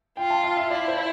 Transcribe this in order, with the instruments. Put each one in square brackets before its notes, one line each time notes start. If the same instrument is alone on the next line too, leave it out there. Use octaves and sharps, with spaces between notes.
[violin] F4 [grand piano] G5
[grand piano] A5
F5
E5
[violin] E4 [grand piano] D5
[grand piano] C5